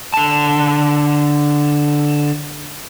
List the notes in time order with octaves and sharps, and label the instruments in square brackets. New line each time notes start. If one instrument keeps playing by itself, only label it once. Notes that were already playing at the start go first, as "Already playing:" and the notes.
[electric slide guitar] D3 A5